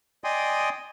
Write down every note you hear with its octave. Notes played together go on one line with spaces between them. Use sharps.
D5 D#5 G5 G#5 C6 D#6